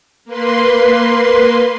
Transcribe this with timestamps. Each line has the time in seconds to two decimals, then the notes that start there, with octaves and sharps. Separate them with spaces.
0.25 A#3 B4 C6